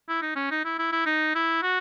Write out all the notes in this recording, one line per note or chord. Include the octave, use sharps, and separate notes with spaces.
E4
D#4
C#4
D#4
E4
E4
E4
D#4
E4
F#4